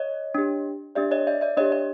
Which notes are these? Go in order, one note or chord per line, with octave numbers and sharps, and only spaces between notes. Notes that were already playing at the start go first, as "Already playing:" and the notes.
Already playing: C#5 D#5
D4 G4
D4 G4 D5 E5
C#5 D#5
D5 E5
D5 E5
D4 G4 C#5 D#5
C#5 D#5